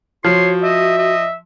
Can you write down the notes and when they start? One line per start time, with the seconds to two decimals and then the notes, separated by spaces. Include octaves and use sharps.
0.25 F3 F#4 C#5 C6
0.63 D#5 E5
0.98 D#5